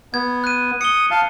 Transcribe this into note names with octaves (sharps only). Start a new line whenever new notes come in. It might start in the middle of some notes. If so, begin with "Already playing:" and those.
B3 G#6
F#6 D#7
D#6 C#7 G7
F5 A5